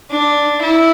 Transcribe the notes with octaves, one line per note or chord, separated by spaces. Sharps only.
D4
E4